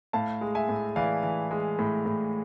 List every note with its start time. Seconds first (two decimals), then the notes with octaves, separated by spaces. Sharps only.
0.13 A2 F5 A5
0.41 G#3
0.55 E5 G#5
0.69 A2
0.96 E3 D5 F5
1.23 E3
1.51 G#3
1.79 A2
2.06 A2